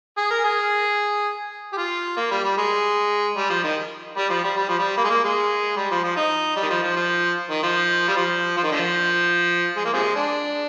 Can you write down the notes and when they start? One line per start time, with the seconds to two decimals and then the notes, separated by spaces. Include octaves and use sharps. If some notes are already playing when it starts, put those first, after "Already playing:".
0.17 G#4
0.31 A#4
0.44 G#4
1.72 G4
1.77 F4
2.17 A#3
2.31 G3
2.43 G3
2.58 G#3
3.37 G3
3.50 F3
3.64 D#3
4.18 G3
4.30 F3
4.44 G3
4.56 G3
4.69 F3
4.79 G3
4.97 A#3
5.04 G#3
5.10 A#3
5.24 G#3
5.76 G3
5.91 F3
6.04 F3
6.16 D#4
6.56 G3
6.63 D#3
6.70 F3
6.83 F3
6.96 F3
7.51 D#3
7.63 F3
8.08 G3
8.17 F3
8.57 F3
8.63 D#3
8.72 D3 F3
9.76 G#3
9.85 A#3
9.93 C3 F3 G#3
10.16 D4